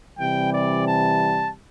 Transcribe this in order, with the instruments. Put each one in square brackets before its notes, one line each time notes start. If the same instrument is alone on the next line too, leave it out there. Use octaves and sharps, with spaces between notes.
[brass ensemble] C3 E3 G3 G5
D5
A5